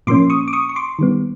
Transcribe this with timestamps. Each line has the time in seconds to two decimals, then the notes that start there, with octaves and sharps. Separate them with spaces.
0.07 A#2 F3 A#3 C#4 C6 D6
0.30 C#6 D#6
0.48 D6
0.53 C#6 D#6
0.69 C#6
0.76 C6 D6
0.99 D#3 G3 B3